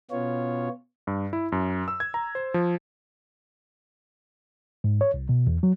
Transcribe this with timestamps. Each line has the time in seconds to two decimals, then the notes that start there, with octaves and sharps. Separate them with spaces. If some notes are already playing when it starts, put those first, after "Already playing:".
0.11 B2 B3 C#4 F4 C#5
1.07 G2
1.33 E4
1.52 F#2
1.88 E6
2.00 G#6
2.14 A#5
2.35 C5
2.54 F3
4.84 G#2
5.01 C#5
5.14 C2
5.29 B2
5.47 E2
5.63 F#3